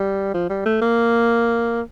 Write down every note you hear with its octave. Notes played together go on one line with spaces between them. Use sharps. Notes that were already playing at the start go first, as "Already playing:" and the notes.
Already playing: G3
F3
G3
A3
A#3